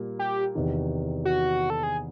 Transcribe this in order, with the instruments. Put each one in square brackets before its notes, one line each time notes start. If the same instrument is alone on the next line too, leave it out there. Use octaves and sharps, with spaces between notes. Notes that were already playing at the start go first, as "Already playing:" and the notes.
Already playing: [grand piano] A#2 G3 A#3
[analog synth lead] G4
[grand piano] E2 C3 D#3
[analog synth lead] F#4
A4
G#4